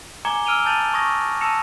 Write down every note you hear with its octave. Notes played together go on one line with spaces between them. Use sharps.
G#5 A#5 D6 G#6 C#7 G7
E6 F6 D7 D#7 F7 G7
A5 G6 A6 D#7 F7 F#7
C#6 D#6 G#6 A#6
A5 E6 A#6 C#7 E7 F7